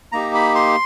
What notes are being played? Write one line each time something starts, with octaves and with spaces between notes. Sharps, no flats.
A#3 D#4 G4 A#5
B5
C6